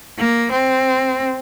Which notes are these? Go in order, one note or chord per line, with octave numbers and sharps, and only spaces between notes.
A#3
C4